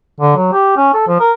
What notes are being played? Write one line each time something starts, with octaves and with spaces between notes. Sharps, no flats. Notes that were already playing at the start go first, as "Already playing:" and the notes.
D3
F#3
G4
C#4
A4
F3
A#4